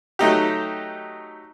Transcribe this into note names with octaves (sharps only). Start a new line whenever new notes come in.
F#3 A3 D#4 G4